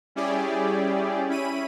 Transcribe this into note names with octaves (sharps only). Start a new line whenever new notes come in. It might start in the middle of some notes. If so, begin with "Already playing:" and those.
G3 C#4 E4 G4 G#4 D5
C#4 E4 B5 D#7